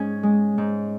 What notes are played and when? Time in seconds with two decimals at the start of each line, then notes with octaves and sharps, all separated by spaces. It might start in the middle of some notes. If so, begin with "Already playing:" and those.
Already playing: G#2 C#4 G#4
0.23 G#3
0.58 G#2